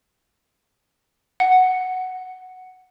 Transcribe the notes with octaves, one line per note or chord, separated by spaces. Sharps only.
F#5